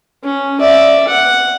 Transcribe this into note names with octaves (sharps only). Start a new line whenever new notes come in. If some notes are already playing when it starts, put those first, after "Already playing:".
C#4
D5 E5
F#5